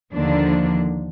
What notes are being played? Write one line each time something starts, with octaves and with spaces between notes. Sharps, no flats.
D#2 D3 F3 A#3 D4